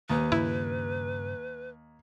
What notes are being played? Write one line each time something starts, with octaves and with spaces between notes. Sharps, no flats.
D#2 B4
G2 C#3 E4